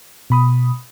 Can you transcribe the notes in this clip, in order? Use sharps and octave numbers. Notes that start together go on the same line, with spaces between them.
B2 B5 D#6